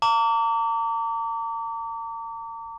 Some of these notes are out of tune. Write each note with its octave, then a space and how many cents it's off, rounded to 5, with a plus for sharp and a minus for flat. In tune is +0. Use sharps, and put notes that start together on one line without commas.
A#5 -40 D6 -35